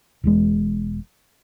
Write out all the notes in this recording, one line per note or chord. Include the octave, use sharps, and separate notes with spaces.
E1 E2 G#3